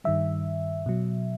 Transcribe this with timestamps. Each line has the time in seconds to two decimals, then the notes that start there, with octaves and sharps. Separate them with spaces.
0.04 G2 D#3 G3 E5
0.86 B2 F#3